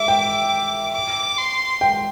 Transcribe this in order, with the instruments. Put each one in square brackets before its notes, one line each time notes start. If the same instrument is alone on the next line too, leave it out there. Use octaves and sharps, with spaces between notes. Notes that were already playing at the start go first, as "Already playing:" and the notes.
Already playing: [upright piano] E5 [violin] D6
[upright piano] G5
[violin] D6
C6
[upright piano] G5